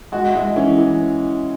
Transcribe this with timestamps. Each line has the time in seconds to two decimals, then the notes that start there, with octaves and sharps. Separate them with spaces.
0.12 G#3 F#4
0.35 G#3 E4
0.56 E3 C#4
0.78 E3